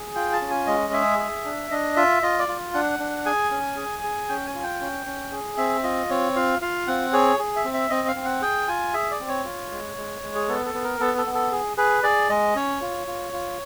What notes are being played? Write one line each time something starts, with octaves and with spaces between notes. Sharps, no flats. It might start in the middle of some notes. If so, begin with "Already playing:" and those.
Already playing: G#4
F4 G5
A5
C#4
G#5
G#3 D#5
G#4 E5
G#4
D4
D4 D#5
F4 E5
F4 D#5
D5
F4
D4 F#5
D4
G#4 G#5
C#4
G#4
G#4
C#4 G5
G#5
F4
G5
C#4
C#4
G#4
C4 E5
F4 D#5
C4 C#5
F4 F5
F4 F5
C4 F#5
G#4 C#5
G#4
E5
C4
E5
C4 D#5
F5
C4
F#5
G#4 G5
F4 G#5
G#4 E5
D5
C4
C#5
F4
G#3
G#3
G#3
G#4
B3 A4
A4
B3
A#4
B3 A4
A4
B3
A4
G#4
G#4 B4
G#4 D5
G#3 D#5
C#4 C#5
F4
F4
F4